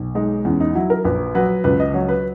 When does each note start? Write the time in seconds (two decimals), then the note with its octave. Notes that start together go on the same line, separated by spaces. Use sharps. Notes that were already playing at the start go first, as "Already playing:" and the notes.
Already playing: B1
0.15 G#3 D#4
0.45 E2 C#4
0.60 D#4
0.75 F#3 E4
0.90 A#4
1.05 A#1 B4
1.35 F#3 B4
1.64 C#2 B4
1.80 D#5
1.94 F#3 C#5
2.08 B4